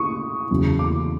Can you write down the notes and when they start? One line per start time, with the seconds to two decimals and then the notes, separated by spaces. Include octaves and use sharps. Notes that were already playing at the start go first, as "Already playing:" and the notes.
Already playing: C#6 D#6
0.51 E2 C#3 F#3
0.79 D6